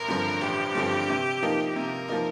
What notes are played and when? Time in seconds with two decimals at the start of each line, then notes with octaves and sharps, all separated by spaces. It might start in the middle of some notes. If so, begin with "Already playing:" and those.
Already playing: A1 A#4
0.08 G2 D3 F3 C4
0.41 A1 G4
0.75 G2 D3 F3 C4
1.09 C3
1.43 F3 A#3 D#4
1.76 C3 A#4
2.08 F3 A#3 D#4